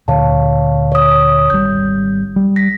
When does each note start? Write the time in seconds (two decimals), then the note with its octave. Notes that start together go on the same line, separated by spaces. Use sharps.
0.08 D2 A#2 D3 C#5 F5 A5
0.92 C#5 D#6
1.50 G#1 G3 G6
2.36 G3
2.56 A#6 B6